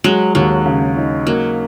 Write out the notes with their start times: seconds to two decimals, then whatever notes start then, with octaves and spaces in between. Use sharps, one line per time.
0.04 F#3 G#3
0.35 D#2 F#3
0.65 C#3
0.97 D#4
1.27 F#3 A#3